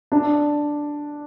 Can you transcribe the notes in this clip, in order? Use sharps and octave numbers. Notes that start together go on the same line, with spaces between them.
D4